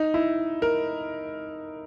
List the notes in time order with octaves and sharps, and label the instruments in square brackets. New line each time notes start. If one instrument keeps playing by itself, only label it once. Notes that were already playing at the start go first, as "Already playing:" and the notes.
Already playing: [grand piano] D#4
E4
A#4